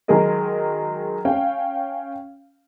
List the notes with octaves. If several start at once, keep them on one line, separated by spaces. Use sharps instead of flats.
D#3 F#3 G#3 G#4 A#4 D#5
C#4 F5 G5